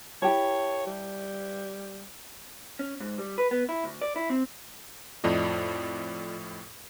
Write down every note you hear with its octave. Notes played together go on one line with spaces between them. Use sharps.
E4 G4 C#5 A5
G3
C#4
G#2
G3
B4
B3
E4
D2
D5
E4
C4
F2 A2 F4 D5 D#5